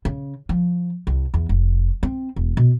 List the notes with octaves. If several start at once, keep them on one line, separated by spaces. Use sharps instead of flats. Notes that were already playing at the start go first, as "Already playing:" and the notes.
C#3
F3
C2
E2
F1
C4
E1
B2